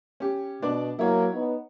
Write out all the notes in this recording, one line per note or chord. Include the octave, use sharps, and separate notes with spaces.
C#4 G4
B2 D4 B4 D5
F#3 A#3 E4 C#5
B3 D#4